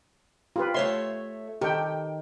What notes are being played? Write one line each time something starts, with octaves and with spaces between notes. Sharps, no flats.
F4 G4 B4
A3 C#5 E5 C6
D#3 G4 A4 G5